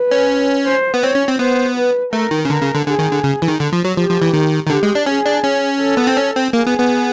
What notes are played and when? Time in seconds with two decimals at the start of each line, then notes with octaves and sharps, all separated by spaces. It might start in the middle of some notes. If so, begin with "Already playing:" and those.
Already playing: B4
0.11 C#4
0.66 C5
0.94 B3
1.03 C4 C#5
1.15 C#4
1.28 C4
1.39 B3 C5
1.77 B4
2.13 A3 A#4
2.31 D#3
2.45 C#3
2.50 D3 A#4
2.62 C#3
2.75 D3
2.86 D3 G#4
2.99 D#3
3.11 D3
3.24 C#3
3.42 E3
3.48 D#3
3.60 D3
3.73 F3
3.85 F#3
3.96 F3 G4
4.09 F3
4.22 E3
4.33 D#3
4.66 D#3
4.70 D3 G4
4.83 G#3
4.95 D4
5.06 C#4 G#4
5.26 D4
5.44 C#4
5.81 A4
5.97 B3
6.07 C4
6.17 C#4
6.35 C4
6.53 A#3 G#4
6.67 B3
6.78 B3